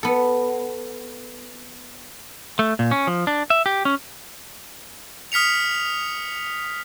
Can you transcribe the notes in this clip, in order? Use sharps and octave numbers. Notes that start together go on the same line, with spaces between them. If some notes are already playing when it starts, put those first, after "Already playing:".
B3 A4
A3
A#2
C#4
F3
D4
E5
G4
C#4
D#6 F6 B6 C#7 F7